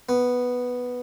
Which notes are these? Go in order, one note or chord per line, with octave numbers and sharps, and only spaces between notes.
B3